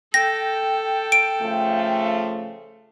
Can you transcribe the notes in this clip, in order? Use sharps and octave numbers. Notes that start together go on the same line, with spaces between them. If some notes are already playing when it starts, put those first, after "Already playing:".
A4 G5 A#6
D7
C#3 F3 A3